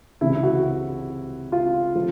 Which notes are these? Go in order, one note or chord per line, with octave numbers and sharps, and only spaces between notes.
C#2 C3 E3 E4
F#4
F4
F3